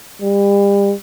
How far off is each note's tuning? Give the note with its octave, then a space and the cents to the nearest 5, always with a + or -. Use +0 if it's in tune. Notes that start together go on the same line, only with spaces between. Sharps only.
G3 +35